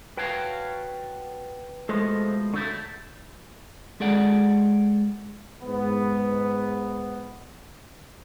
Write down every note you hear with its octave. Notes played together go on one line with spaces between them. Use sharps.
F#4 B4 C#5 F5 G5 A5
B2 F3 G#3 A3 A4 C5 D#5
D3 F#3 A3 E4 G6
G#3 G#4 A4 D5 F#5
G#2 B3